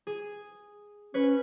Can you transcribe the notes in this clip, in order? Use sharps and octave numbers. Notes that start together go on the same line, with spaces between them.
G#4
C#4 B4 C#5